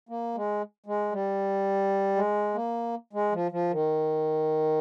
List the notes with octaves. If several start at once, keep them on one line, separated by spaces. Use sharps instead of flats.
A#3
G#3
G#3
G3
G#3
A#3
G#3
F3
F3
D#3